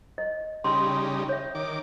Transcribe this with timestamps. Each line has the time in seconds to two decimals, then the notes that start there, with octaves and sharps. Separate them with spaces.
0.18 D#5
0.64 C#3 G3 D#4 B5 C6
1.29 C#5 E5
1.55 D#3 D6